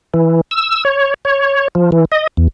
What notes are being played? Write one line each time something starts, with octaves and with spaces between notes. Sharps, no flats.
E3
E6
C#5
C#5
F3
E3
D#5
E2